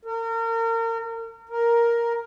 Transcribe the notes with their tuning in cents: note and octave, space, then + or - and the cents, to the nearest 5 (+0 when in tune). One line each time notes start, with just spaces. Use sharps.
A#4 -35
A#4 +5